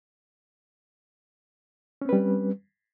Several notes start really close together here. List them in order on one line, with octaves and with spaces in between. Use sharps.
C#4 C4 B4 G3